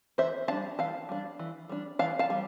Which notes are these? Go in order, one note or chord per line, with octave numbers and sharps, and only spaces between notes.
E3 C5 E5
G3 D4 F5 A5
E3 F5 A5
G3 D4
E3
G3 D4
E3 F5 A5
F5 A5
G3